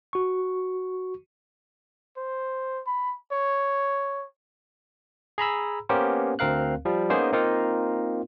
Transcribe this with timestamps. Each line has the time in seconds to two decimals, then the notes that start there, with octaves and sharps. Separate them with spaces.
0.13 F#4 C#6
2.17 C5
2.87 B5
3.32 C#5
5.38 G#4 A#5 B5 E6
5.89 A#3 B3 C#4 G4 A#4 C5
6.39 D2 C4 A#4 F5 F#6
6.85 F3 G3
7.10 A#3 B3 C#4 D#4 G#4 C5
7.32 A#3 C4 D#4 F4 A#4